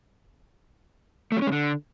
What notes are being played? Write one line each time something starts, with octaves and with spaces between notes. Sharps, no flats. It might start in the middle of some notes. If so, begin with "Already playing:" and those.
A3
F#3
C#4
G#3
D3